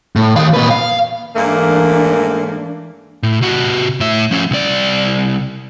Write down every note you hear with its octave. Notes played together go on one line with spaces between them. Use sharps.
A2
D#3 F5
A#2 B4
F5
G#2 E3 A3 A#3 D4
A2
C3 F#4
A2 E5
F3 C#4
C2 D5